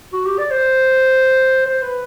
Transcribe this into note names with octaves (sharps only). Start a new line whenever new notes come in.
F#4
G4
D5
C5
C5
B4